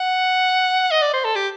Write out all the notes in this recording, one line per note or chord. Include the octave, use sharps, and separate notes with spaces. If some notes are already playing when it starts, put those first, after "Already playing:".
Already playing: F#5
D#5
D5
C5
A4
G4